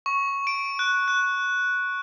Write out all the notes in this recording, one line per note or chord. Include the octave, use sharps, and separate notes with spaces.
C#6
D7
F#6
F#6